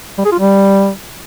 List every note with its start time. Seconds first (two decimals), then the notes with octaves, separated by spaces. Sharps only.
0.18 G3
0.25 G#4
0.32 F4
0.39 G3